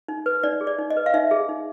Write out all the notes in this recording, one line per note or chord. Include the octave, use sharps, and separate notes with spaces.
D#4
B4
D#4 D5
G#4
D5
D#4
D#5
B4
F5
D#4 E5
G#4
D#4